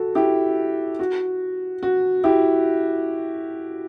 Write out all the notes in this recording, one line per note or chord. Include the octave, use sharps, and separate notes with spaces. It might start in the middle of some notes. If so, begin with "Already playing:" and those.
Already playing: F#4 A4
E4 G4
F#4
F#4
E4 G4